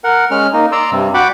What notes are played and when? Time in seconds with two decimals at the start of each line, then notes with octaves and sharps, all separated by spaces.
0.04 A#4 F#5
0.31 G#3 C#4 F6
0.53 A#3 D#4
0.72 D5 A#5 C6 E6
0.92 G2 C3 G3
1.14 F#4 D5 F#5 G5 B5 D6